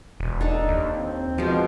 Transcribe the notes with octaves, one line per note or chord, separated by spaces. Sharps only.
E1
D4 D#4 A4
D#2
C4
B2 F3 G#3